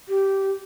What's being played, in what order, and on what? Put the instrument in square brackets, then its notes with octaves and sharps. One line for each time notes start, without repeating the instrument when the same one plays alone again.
[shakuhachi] G4